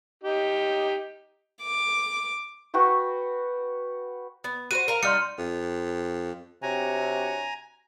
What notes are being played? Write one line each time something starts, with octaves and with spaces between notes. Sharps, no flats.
D#4 G4
D6
F#4 B4 G5 C#6
B3
F#4 A#4 C5 D#7
A#4 F5 A#5
G3 D#4 F#4 C6 F6 C#7
F2
C3 D4 F#4 C#5 G#5 A#5